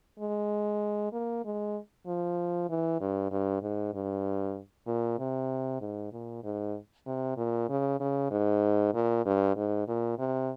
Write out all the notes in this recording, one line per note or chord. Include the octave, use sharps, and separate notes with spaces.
G#3
A#3
G#3
F3
E3
G2
G2
G#2
G2
A#2
C3
G#2
A#2
G#2
C3
A#2
C#3
C#3
G#2
A#2
G2
G#2
A#2
C3